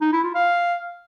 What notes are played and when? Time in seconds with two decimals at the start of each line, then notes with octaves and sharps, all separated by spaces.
0.01 D#4
0.12 E4
0.24 F4
0.35 F5